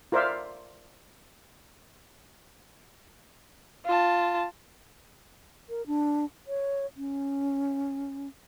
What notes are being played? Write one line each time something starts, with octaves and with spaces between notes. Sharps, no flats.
F4 A#4 C5 D5 E5 F5
F4 A5
A#4
D4
C#5
C#4